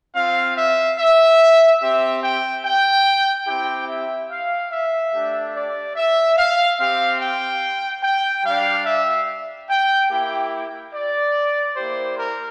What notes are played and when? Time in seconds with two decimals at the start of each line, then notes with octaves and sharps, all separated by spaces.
0.15 C4 F4 F5
0.57 E5
0.98 E5
1.81 C4 G4 E5
2.22 G5
2.64 G5
3.47 C4 E4 G4 G5
3.88 E5
4.30 F5
4.71 E5
5.13 A3 D4 G4
5.54 D5
5.96 E5
6.37 F5
6.78 C4 G4 F5
7.20 G5
8.03 G5
8.44 G3 D4 G4 F5
8.86 E5
9.69 G5
10.10 A#3 E4 G4 G5
10.93 D5
11.76 A#3 E4 G4 C5
12.18 A#4